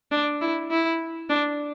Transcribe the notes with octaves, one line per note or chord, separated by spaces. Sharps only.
D4
E4
E4
D4